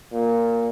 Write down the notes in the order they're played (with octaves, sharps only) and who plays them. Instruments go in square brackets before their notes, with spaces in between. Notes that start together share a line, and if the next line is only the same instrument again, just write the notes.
[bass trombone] A#2